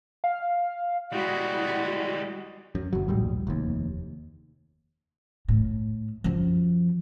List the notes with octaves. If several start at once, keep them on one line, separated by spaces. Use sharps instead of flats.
F5
G3 G#3 E4 F#4
F#2
G1 F#3
A#1 D#2 A2 G3
F1 D#2
A2
F#2 F3